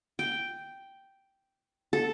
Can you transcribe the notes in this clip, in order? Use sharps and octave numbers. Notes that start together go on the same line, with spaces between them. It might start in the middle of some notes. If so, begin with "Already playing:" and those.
G5
A4